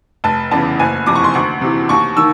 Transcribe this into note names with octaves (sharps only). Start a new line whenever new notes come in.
F1 A5
E2 C#3 E3 A5
F#1 G#5
F2 C3 E3 D6
C#6
C6
D2 C#6
C3 E3
D#2 C#6
D#3 E6